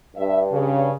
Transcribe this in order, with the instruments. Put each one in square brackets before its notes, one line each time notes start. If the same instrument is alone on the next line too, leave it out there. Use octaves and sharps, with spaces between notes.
[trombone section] G2 [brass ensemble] E5
[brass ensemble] C#3